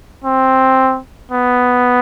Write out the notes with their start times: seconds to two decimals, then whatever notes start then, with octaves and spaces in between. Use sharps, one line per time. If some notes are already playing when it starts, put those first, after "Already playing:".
0.24 C4
1.32 B3